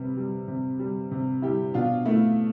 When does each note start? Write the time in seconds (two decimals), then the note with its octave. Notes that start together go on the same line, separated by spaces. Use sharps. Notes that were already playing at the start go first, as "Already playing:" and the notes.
Already playing: C3 G3 B4
0.17 G3
0.48 C3
0.79 G3
1.11 C3
1.42 G3 E4 G4
1.74 B2 D4 F4
2.06 A3 E4